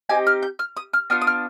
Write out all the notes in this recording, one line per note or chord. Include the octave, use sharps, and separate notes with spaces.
C4 D#4 G4 G#5
F6
G6
F6
D#6
F6
B3 D4 F4 F6
D#6
F6